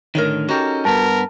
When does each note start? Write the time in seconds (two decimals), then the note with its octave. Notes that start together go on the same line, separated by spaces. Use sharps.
0.15 A2 D3 D#3 A#4 C#5 D#5
0.49 C#4 D#4 F#4 G4 A4 A#4
0.85 G2 B3 A#4 A5